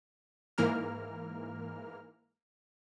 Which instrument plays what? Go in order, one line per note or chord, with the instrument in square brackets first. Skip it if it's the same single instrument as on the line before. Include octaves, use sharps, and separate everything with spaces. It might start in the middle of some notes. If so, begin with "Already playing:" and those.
[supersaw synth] G#2 E3 A#3 A#4 F6